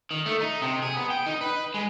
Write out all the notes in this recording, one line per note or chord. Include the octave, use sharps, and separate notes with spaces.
D#3
A3
D#4
C3
G#4
B3
G5
D#4
B4
G#3